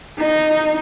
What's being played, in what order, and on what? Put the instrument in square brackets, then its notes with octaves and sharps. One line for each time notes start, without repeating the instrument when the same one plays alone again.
[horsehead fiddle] D#4